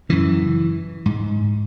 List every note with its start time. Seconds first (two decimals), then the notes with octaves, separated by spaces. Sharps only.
0.09 F#2 C#3 E3
1.06 G#2